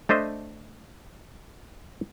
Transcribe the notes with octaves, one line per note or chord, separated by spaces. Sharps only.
A3 D4 C5 D#5 E5